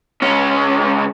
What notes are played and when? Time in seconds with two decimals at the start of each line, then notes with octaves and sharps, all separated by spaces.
0.22 C#2 C#4